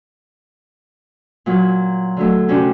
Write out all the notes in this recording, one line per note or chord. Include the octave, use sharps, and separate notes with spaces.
A#2 F#3
D3 F#3 A3
C3 C#4 D4 F#4 G4